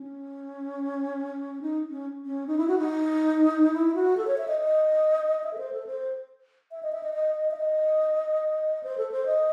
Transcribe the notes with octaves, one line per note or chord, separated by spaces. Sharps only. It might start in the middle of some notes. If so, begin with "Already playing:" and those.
Already playing: C#4
D#4
C#4
C#4
D#4
E4
F#4
D#4
E4
F#4
A4
C#5
E5
D#5
D#5
E5
A4
C5
A4
C5
E5
D#5
E5
D#5
D#5
D#5
E5
D#5
C5
A4
C5
D#5